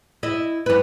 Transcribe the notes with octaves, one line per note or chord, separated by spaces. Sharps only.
E4 D#5
G2 B4